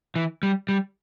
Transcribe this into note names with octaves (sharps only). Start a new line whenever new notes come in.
E3
G3
G3